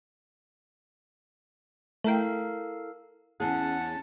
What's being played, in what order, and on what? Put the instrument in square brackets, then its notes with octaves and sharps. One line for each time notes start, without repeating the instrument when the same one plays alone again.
[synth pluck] A3 G5 [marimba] E4 A#5 [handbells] A4 A#4 F5
[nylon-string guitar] E2 G#4 [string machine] C#4 [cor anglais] F#5 [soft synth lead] A5